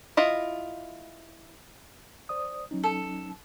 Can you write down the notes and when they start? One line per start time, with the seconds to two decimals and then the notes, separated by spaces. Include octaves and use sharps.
0.17 E4 F4 D#5
2.29 C5 D5 D#6
2.71 F#3 C#4 D#4
2.83 A4